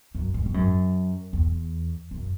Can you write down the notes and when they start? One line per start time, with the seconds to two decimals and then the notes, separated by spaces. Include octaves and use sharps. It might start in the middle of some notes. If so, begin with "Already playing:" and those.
0.15 F#2
0.34 G#2
0.46 G#2
0.54 F#2
1.33 E2
2.11 F#2